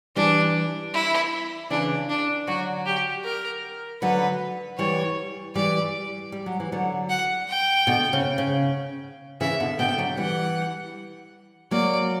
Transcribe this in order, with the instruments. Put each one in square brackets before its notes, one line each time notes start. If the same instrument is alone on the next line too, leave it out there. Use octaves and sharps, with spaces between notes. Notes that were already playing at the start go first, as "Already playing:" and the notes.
[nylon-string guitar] E3 G3 [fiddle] D4
[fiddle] E4
[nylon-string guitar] C#3 E3 [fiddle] D4
[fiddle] D4
[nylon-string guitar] D3 F#3 [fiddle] F#4
[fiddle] G4
A#4
[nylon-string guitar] D3 F#3 [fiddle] B4
[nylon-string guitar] E3 G3 [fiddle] C#5
[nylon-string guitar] E3 G3 [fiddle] D5
[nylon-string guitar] G3
F#3
E3
D3 F#3
[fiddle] F#5
G5
[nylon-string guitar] B2 D3
C#3
C#3
[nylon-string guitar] C#3 E3 [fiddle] E5
[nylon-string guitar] B2 D3
[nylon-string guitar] B2 D3 [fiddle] G5
[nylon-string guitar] D3 F#3
[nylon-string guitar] E3 G3 [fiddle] F#5
[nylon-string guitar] F#3 A#3 [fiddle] D5